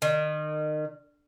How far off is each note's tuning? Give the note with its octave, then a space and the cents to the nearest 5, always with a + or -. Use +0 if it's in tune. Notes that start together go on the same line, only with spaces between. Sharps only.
D#3 -30